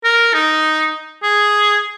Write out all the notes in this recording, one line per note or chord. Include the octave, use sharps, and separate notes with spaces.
A#4
D#4
G#4